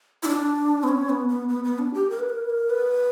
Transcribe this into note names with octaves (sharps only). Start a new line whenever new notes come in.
E4
D4
B3
C#4
B3
B3
B3
B3
D4
G4
A#4
B4
A#4
B4
A#4
B4